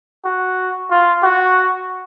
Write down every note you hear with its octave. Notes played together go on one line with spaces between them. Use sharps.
F#4
F4
F#4